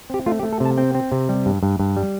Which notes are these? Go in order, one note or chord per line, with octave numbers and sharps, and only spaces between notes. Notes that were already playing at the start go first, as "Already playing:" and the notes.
C4 G4
A3 F4
G4
A3
A4
C3
A5
C4 G5
C4
C3
G3
G2
G2
G2
G3